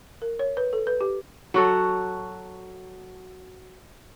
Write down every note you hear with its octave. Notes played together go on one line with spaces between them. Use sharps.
A#4
C#5
B4
A4
B4
G4
F#3 F#4 A4